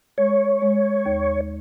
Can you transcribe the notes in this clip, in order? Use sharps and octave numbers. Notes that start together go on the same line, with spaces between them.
G#3 C#5
G#3
D#2